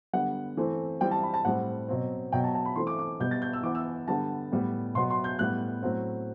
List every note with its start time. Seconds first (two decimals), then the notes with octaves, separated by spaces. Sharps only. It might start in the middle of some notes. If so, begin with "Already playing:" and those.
0.13 D3 G3 B3 F#5
0.57 E3 A3 C4
1.01 E3 G3 C4 G5
1.11 A5
1.23 B5
1.34 A5
1.45 A2 G3 C4 F#5
1.88 B2 F#3 C4
2.32 B2 F#3 B3 G5
2.44 A5
2.55 A5
2.65 B5
2.76 E3 A3 C4 C6
2.87 D6
2.99 D6
3.20 B2 G3 B3 G6
3.31 A6
3.42 G6
3.53 E6
3.63 E3 B3 D6
3.75 E6
4.08 D3 G3 B3 A5
4.52 A2 G3 B3
4.95 B2 F#3 B3 C6
5.10 C6
5.24 G6
5.39 A2 G3 B3 F#6
5.83 A2 F#3 C4